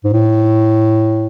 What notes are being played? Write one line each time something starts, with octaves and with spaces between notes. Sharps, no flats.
G#2
A2